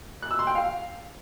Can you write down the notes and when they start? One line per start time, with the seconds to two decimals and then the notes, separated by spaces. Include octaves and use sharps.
0.22 F#6
0.31 E6
0.39 C6
0.47 G5
0.55 F5